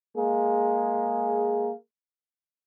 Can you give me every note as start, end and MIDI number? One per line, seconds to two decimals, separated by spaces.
0.16 1.72 56
0.16 1.72 58
0.16 1.72 68